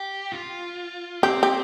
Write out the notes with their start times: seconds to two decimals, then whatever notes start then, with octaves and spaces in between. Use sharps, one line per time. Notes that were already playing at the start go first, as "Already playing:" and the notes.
Already playing: G4
0.32 F4
1.23 C4 G4
1.43 G4